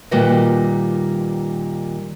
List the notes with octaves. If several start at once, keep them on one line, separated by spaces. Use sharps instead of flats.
A#2 D#3 G3 F#4 B4 D#5